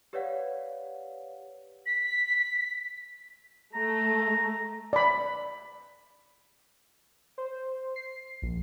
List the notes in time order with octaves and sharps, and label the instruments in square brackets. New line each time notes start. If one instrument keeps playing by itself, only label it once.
[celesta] G4 B4 C#5 D5 F5 F#5
[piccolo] B6
[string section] A3 [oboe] A#5
[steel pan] D5 B5
[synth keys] C5
C7
A#1